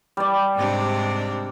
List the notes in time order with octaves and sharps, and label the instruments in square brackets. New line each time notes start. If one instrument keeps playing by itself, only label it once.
[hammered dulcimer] G3 D5
[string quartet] G#2 C3 D4